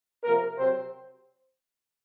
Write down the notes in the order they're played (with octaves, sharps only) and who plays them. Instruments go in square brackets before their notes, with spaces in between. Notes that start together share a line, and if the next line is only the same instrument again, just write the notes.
[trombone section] C3 F3 A#3 A#4
C3 F#3 C4 C5